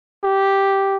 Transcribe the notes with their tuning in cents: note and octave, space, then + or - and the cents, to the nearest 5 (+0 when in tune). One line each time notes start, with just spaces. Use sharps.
G4 -5